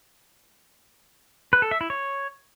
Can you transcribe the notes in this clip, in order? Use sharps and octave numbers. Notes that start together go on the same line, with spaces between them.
B4
A4
E5
E4
C#5